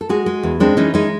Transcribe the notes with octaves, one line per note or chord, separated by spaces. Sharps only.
A4
G#3 F#4 G#4
G#3
E2
G#3 C4 D4
E3 C#4 D#4
G#3 C#4 D#4